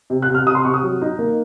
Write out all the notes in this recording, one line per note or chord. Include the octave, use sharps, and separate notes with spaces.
C3
F#6
C3
F6
C3 D#6
C6
C3 C#6
D#6
F#3
D#4
A#3